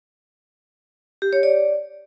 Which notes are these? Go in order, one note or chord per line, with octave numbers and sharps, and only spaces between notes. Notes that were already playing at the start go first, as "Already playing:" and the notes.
G4
C#5
D5